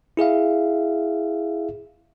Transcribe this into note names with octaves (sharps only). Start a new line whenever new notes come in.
E4 G#4 E5 F5